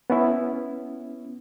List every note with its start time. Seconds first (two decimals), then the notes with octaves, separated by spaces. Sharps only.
0.10 B3 C#4 E4